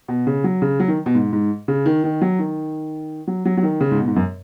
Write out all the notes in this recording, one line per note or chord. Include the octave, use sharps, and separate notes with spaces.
B2
C#3
F#3
C#3
F#3
D#3
B2
G#2
G#2
C#3
D#3
D#3
F#3
D#3
F#3
F#3
F#3
D#3
C#3
G#2
B2
G#2
F#2